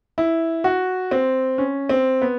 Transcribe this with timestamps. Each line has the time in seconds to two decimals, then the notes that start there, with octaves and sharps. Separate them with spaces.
0.18 E4
0.64 F#4
1.11 C4
1.58 C#4
1.89 C4
2.22 B3